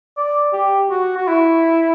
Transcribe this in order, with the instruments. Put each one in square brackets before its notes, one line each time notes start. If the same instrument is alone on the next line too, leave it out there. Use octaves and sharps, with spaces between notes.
[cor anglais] D5
G4
F#4
F#4
E4